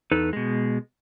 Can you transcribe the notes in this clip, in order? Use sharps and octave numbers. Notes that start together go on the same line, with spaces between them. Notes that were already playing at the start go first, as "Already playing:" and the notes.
E2 D#4 A4 B4
B2 G#3